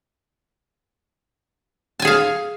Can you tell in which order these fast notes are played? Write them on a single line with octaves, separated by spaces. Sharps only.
A5 G#5 G#4 F5